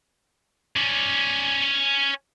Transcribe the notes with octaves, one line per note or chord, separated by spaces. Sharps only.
C#4 D5